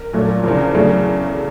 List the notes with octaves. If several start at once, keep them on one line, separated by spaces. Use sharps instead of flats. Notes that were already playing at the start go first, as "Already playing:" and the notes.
Already playing: A#4
A#2 F#3 A3
E2 C#3 F3 A#4
E2 C#3 F#3 A3